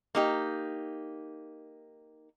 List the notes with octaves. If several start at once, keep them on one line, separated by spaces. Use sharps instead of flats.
A#3 D#4 G4